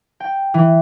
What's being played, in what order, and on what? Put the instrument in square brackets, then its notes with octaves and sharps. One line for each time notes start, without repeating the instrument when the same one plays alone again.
[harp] G5
E3